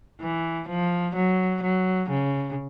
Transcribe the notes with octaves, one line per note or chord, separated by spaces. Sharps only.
E3
F3
F#3
F#3
C#3